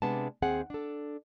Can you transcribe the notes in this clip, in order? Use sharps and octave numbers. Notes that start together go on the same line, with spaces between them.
C3 G#3 B3 D4 A5
D#2 C4 G#4 F#5
D4 A4